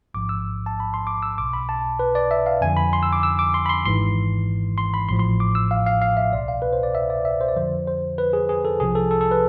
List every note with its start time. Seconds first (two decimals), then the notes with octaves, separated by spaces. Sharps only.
0.14 A1 G#2 F3 D6
0.29 E6
0.66 A5
0.80 B5
0.94 C6
1.07 D6
1.23 E6
1.38 B1 B2 D6
1.53 B5
1.69 A5
1.99 B4
2.15 D5
2.31 E5
2.46 F5
2.61 F2 D3 F3 G#5
2.77 B5
2.93 C6
3.03 E6
3.13 D6
3.23 E6
3.39 D6
3.54 C6
3.66 B5
3.69 C6
3.85 G#1 G#2 E3 C6
4.78 C6
4.94 B5
5.09 A1 A2 F3 C6
5.19 C6
5.40 D6
5.55 E6
5.71 F5
5.86 F5
6.02 F5
6.17 E5
6.32 C2 B2 D5
6.48 F5
6.62 B4
6.73 C5
6.83 D5
6.95 E5
7.10 D5
7.25 E5
7.41 C5
7.49 D5
7.56 F2 D3 F3 C5
7.88 C5
8.18 B4
8.33 G#4
8.49 G#4
8.65 A4
8.80 C2 C3 F3 G#4
8.95 A4
9.11 A4
9.21 A4
9.31 B4